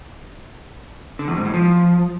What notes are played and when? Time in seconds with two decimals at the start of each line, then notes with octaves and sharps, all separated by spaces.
1.19 D3
1.28 E2
1.36 G#2
1.45 A2
1.54 F3